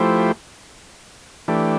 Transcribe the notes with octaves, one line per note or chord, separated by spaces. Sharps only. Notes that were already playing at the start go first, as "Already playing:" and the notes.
Already playing: F3 A3 E4 G4 C5
E3 A3 D4 G4